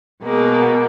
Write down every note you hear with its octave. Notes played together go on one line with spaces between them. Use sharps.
B2 G#3 A#3